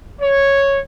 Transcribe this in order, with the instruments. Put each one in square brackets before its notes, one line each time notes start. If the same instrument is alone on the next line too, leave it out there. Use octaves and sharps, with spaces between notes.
[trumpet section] C#5